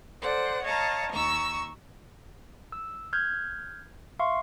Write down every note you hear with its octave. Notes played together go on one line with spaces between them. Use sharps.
A4 C5 D5 F#5
C#5 D#5 F5 A5 A#5
D#2 A#5 C#6 E6
E6
F6 G6 G#6
E5 F5 C6 C#6